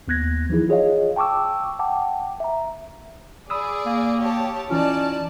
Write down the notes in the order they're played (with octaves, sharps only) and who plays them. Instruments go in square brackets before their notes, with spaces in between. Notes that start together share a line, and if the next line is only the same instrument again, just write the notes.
[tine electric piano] D#2 B3 F#6 G#6 A#6
E3 F3 D#4 E4 G#4
F4 G#4 C#5 D#5 F5
G5 A5 C#6 D6 E6
F#5 G5 A5 D6
E5 A#5
[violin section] G#4 D5 [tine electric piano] B5 D#6 E6
[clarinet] A#3
[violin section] G4 C#5 A5
[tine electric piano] E3 F4 [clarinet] C#4 [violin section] D#4 D5 A5